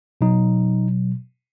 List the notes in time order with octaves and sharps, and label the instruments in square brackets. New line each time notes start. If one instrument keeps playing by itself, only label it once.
[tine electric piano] B2 F#3 D#4